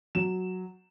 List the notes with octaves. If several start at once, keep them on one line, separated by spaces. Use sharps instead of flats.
F#3 E7